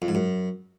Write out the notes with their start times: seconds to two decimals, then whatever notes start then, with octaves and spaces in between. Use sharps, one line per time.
0.02 F2
0.08 G#2
0.15 F#2